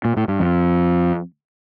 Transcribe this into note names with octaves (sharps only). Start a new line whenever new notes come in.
A#2
A2
G2
F2